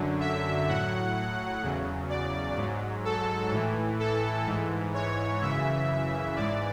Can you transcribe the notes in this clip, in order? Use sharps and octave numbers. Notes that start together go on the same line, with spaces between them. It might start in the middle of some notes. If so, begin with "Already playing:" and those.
Already playing: F#2 D3 F#3
E5
A2 F#3 F#5
E2 C#3 F#3
D5
G#2
F#3
A4
A2 E3
A4
G#2 E3
C#5
F#2 C#3 E3 E5
G#2 E3 D5